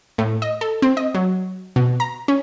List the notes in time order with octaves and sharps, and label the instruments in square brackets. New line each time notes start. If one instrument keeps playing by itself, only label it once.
[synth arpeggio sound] A2
D#5
A4
C4
D#5
F#3
B2
A#5
C#4